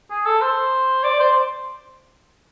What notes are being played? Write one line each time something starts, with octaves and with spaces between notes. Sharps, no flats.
G#4
A4
C5
D5
C5